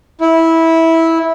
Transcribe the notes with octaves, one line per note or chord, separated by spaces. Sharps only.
E4